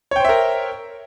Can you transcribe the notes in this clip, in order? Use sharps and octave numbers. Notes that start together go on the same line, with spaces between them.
A#4 C5 C#5 E5 G5